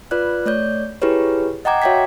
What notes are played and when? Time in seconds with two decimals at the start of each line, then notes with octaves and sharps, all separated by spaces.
0.11 F4 B4 D5 F#6
0.46 A3 C#5 D5 G6
1.02 E4 G4 G#4 B4 C#5
1.65 D#5 F#5 G5 A#5 D6 G#6
1.82 F#4 C#5 E5 G5 G#6 B6